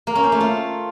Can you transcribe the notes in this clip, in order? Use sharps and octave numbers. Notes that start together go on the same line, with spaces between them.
A#3
C#4
C5
A3
F4